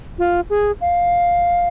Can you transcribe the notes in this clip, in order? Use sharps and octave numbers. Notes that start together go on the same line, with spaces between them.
F4
G#4
F5